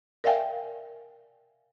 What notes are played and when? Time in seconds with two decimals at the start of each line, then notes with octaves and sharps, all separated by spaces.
0.24 A#4 D5 E5 F5 G5 G#5